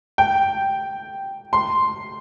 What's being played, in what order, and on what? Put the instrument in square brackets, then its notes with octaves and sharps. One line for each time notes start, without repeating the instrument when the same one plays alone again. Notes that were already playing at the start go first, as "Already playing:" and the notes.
[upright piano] G5
C6